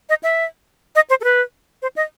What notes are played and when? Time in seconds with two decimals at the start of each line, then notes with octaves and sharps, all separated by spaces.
0.09 D#5
0.23 E5
0.95 D#5
1.10 C5
1.21 A4
1.24 B4
1.82 C5
1.96 D#5